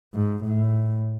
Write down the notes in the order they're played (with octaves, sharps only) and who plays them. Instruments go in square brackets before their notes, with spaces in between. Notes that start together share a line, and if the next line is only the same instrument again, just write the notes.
[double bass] G#2
A2